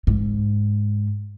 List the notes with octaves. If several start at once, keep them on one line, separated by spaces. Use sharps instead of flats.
G#2